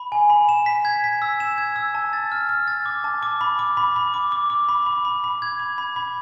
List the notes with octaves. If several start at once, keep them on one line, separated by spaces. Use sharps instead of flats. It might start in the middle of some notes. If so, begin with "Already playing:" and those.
Already playing: B5
G#5
B5
E7
B6
G#6
B6
E6
E7
G#6
E6
A5
A6
F6
F6
A6
D6
A5
D6
B5
D6
B5
B5
D6
D6
D6
B5
B5
B5
B5
G#6
B5
B5
B5